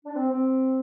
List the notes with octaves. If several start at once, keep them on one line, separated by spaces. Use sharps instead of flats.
D4
C4
C4